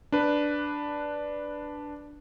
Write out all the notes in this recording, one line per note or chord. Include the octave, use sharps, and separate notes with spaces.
D4 B4